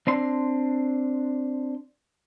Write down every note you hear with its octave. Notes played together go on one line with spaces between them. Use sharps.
C4 D4 C6